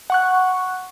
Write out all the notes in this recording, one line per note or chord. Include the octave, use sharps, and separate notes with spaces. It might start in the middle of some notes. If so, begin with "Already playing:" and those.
F#5 C#6 F#6